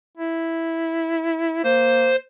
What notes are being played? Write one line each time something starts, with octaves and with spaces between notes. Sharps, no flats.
E4
A#3 C5